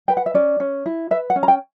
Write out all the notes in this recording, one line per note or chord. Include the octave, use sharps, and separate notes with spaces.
B4 G5
F#5
E5
C#4 D5
C#4
E4
B4 E5
F#5
C#4
A#5
G5